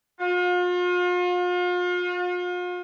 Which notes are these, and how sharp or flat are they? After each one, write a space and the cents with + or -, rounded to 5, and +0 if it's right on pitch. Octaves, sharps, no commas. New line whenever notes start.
F4 +40